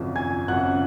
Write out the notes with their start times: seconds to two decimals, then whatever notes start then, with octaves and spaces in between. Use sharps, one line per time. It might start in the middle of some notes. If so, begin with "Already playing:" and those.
Already playing: G#1 F#2 C#3 F3
0.16 G#5 G#6
0.48 G#1 F#2 C#3 F3 F#5 F#6